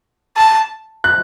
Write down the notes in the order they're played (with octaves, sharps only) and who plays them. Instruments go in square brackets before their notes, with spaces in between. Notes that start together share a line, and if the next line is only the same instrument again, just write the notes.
[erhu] A5
[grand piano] F#6